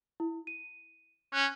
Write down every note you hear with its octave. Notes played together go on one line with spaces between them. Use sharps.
E4
D#7
C#4 F#6